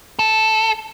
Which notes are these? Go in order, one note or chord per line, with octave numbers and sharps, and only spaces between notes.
A4